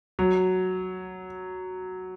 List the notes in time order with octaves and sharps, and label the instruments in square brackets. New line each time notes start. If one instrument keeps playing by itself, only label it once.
[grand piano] F#3